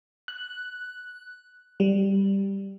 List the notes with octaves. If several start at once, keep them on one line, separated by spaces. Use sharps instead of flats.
F#6
G3